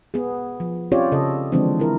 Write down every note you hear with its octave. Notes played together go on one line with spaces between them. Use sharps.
B3 G#4
F3
C4 C#4 F4 G4 C#5 D5
C#3 A4 D#5
D3 E3 F3 G#3 C4 D4
E4 A#4